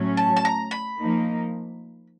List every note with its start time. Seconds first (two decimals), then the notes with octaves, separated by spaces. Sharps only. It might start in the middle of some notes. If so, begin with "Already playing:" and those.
Already playing: A2 F#3 A3 C#4
0.17 A5
0.36 A5
0.45 A#5
0.71 B5
0.99 F3 A#3 D#4